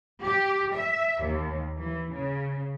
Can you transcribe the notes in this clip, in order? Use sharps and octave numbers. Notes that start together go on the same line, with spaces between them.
G4
E5
D#2
E3
C#3